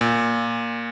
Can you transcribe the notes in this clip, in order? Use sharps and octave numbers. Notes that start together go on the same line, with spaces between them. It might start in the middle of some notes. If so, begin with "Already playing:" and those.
A#2